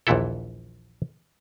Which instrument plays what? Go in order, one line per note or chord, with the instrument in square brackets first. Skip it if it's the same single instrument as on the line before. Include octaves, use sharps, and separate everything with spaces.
[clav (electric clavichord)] A#1 D#2 A#2 E3 E4 A4